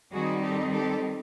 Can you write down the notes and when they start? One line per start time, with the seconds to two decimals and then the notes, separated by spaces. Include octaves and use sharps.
0.12 D#3 G3 C4 D#4 F#4 G#4
0.42 G4 A4
0.72 G4 A4